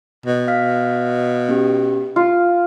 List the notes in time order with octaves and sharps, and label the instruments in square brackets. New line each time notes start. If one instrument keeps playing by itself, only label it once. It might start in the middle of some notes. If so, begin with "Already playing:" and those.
[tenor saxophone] B2
[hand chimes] F5 F6 B6
B3 C#4 G4
[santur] F4 [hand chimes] F6